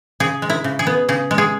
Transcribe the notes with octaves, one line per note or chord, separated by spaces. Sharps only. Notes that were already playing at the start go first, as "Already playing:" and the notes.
C#3 G#4
G#3
E4
C#3
G#4
B3
C#3 G#4
G#3
G#4